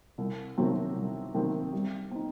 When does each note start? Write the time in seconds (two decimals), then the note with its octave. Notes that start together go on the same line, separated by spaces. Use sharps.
0.18 C2
0.58 C3 D#3 F#3 C4
0.96 C2
1.34 C3 D#3 F#3 C4
1.73 G3
2.11 C4 D#4